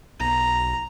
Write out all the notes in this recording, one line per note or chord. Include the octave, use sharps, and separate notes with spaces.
B1 A#5